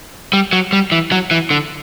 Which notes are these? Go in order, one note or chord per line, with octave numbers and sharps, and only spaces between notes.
G3
F#3
G3
E3
F#3
E3
D3